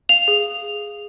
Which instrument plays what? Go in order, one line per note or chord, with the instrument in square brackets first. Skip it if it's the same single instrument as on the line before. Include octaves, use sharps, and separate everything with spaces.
[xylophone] F5 F7
G#4